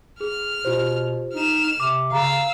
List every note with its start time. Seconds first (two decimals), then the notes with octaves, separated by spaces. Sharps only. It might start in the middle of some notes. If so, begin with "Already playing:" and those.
0.21 G#4 F6
0.65 B2 F4 G4 C5
1.34 D#4 F6 E7
1.80 C3 D6
2.12 C#3 F5 A#5 E6